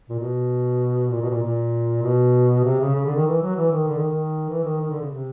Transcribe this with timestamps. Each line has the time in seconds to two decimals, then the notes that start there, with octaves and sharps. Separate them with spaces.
0.09 A#2
0.19 B2
1.11 A#2
1.22 B2
1.31 A#2
1.42 A#2
2.03 B2
2.65 C3
2.81 C#3
2.95 C#3
3.06 D3
3.16 D#3
3.27 E3
3.42 F#3
3.57 E3
3.72 D#3
3.88 D3
3.99 D#3
4.09 D#3
4.49 E3
4.64 D#3
4.81 D#3
4.90 D3
5.01 C#3
5.10 C3